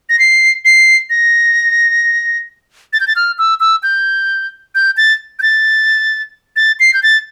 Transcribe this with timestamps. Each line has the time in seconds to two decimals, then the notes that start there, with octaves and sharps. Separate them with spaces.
0.09 A#6
0.19 C7
0.65 C7
1.10 A#6
2.93 A6
3.00 G6
3.08 A6
3.16 F6
3.39 E6
3.60 E6
3.83 G6
4.75 G6
4.97 A6
5.39 G6
5.42 A6
6.56 A6
6.80 C7
6.94 G6
7.03 A6